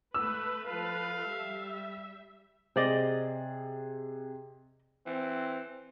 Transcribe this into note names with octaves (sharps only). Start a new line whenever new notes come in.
A3 B4 E6
F3 A4 B4 F5
G3 E5
C3 G#4 C5 D5 D#5 A6
E3 C4